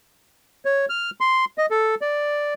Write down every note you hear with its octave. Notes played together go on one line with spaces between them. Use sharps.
C#5
F6
C6
D#5
A4
D5